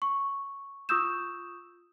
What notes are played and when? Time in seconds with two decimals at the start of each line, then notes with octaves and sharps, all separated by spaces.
0.02 C#6
0.89 F4 C#6 D#6 E6 G6 E7